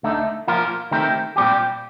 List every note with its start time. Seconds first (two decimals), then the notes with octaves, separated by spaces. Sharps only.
0.03 D2 D3 A3 D#4
0.47 F3 A#3 F4 A#4
0.91 D#3 A3 C4 G4 A#4
1.36 A#2 G3 C4 G4